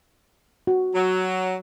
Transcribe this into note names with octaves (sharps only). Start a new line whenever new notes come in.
F#4
F#3